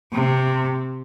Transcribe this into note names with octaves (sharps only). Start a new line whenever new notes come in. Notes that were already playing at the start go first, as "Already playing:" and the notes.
C3